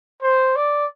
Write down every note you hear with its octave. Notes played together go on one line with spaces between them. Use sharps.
C5
D5